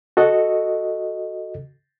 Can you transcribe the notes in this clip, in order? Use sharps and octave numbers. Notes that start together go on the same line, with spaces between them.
F#4 A4 D#5